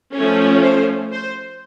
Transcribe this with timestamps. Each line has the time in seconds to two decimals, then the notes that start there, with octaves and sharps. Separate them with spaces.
0.16 F3 A3 C#4
0.62 C5
1.12 C5